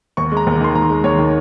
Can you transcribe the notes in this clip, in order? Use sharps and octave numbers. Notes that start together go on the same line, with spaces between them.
D#2 C#6
G#3 A#5
D#2
D#3 C6
D#2 A#5
G#3
D#2 C#5
D#3